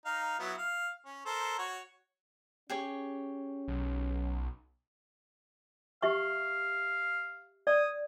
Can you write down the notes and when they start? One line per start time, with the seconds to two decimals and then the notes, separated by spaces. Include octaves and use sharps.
0.06 D#4 F5
0.39 F#3 B3 E4
0.58 F5
1.05 C#4
1.26 A4 A#4 C5
1.58 F#4 C#5
2.70 C#4 G4 G#4 C#5
3.68 B1
6.03 G4 E5 F5 C#6
7.67 D5 D#6